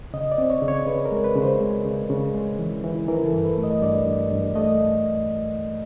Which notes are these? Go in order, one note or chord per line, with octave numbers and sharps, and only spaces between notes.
C#3 D#5
D5
C4
C#5
C#3
C#5
C#3 B4
A#4
G#3
B4
C#3
C5
G#3
C#3
C#3
G#3
E3
E3
E3 A#4
A4
G2
B4
A3
D#5
G2 D5
G2
G2
A3 D#5